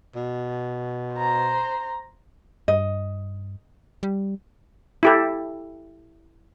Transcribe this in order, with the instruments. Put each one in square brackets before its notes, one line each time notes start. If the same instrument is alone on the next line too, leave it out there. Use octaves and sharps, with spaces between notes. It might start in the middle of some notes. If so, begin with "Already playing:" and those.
[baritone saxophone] B2
[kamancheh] C5 A#5
[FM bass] G2 [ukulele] D#5
[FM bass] G3
[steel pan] E4 G4 A4